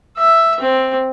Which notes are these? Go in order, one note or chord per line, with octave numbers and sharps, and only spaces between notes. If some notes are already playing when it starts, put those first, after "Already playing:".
E5
C4